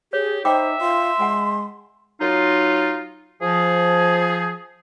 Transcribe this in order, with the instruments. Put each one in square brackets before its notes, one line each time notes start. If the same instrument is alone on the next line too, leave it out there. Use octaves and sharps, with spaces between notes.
[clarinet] G4 [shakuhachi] G#4 [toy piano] C#5
[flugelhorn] D#4 [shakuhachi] C5 [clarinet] E5 [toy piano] G5 B5 D6
[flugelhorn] F4 [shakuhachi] C6
[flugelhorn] G#3 [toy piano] F#5 G#5 A5
[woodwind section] F#3 D#4 F4
F3 G#4